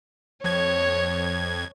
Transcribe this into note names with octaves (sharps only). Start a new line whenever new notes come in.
F2 C#5 G#6